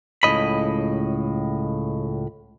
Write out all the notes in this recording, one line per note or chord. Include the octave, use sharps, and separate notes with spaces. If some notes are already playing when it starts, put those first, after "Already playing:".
C#2 A2 E3 D#5 B5